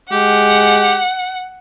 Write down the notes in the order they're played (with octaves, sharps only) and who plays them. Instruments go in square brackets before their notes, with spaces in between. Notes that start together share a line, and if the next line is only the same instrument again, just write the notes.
[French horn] G#3 [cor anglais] G4 [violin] F#5